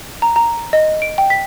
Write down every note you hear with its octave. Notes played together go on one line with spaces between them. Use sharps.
A#5
A#5
D#5
D7
G5
B6